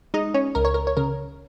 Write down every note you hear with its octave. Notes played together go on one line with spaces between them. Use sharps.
G#3 D#4 D#5
C#4 C#5
C#2 A#4
C#5
A#4
C#5
C#3 A#4